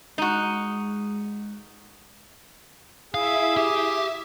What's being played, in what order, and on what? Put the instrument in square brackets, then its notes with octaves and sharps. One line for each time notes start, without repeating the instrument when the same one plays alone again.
[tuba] G#3 [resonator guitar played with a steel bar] D#4 F#4
[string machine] E4 E5 [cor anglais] G#4 [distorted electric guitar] F5
[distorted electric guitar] G4 [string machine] E5